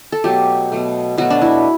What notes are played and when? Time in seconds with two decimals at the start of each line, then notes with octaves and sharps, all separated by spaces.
0.12 A4
0.24 B2 F#3 A3 G4
0.72 B2 F#3 A3
1.18 B2 F#3 A3 F#4
1.30 D4
1.42 E4